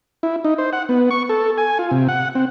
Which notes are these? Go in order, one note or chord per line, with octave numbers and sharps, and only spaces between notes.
E4
D#4
C5
F#5
B3
C#6
A4
G#5
F4
C3
F#5
C4